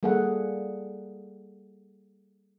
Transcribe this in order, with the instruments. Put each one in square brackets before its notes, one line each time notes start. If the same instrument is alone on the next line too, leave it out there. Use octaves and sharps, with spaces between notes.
[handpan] G3 A#3 G#4 A4 F#5